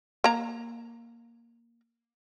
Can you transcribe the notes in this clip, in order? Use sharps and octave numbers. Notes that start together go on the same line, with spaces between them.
A#3 A#5